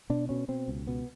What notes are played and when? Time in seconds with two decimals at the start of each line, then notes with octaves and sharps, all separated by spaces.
0.10 B2 D4
0.29 B2 C#4
0.48 B2 C4
0.68 C#2
0.87 B2 B3